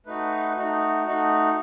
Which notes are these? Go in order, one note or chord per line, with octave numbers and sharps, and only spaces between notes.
A3 D#4 F#4 B4
A3 D#4 F#4
A3 D#4 F#4